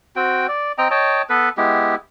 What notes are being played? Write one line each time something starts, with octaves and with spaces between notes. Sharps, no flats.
C4 F#4 G5
D5
C4 D#5 G5 A#5
C#5 D#5 G5 A5
B3 A4 B4
G#3 B3 E4 G4